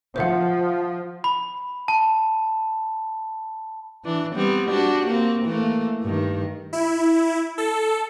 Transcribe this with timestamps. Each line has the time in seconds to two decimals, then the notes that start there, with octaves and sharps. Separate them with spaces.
0.16 F3 C5 E5 F#5
1.24 B5
1.88 A5
4.04 E3 D4
4.35 G3 B3 C4
4.69 D4 F#4 G4
5.07 A#3 C4
5.45 E3 A3 A#3
6.02 G2 D#3
6.73 E4
7.58 A4